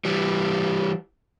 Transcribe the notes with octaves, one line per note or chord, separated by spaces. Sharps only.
E3 G3